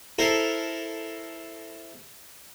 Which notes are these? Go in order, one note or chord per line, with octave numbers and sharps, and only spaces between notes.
E4 A4 A#4 C5